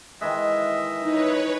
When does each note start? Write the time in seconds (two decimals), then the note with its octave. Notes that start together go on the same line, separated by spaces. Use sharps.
0.21 D#3 E3 G#3 D#5 E5
1.04 D#4 B4 C#5